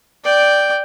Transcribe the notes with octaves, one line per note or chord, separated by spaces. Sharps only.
D5 G5